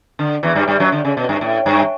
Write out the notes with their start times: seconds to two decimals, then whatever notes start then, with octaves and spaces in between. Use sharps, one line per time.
0.19 D3
0.43 E2 E3
0.55 G2 G3
0.68 G2 G3
0.80 F#2 F#3
0.92 D3
1.05 C#3
1.17 B2
1.29 G2
1.41 A2
1.66 G2